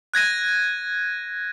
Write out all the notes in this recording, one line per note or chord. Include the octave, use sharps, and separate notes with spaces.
F#6 G#6 A#6 D#7